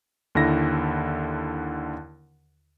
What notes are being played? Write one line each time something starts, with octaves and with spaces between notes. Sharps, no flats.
D#2 D3 E4 A#6